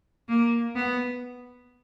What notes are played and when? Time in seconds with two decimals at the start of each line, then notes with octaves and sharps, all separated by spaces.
0.29 A#3
0.75 B3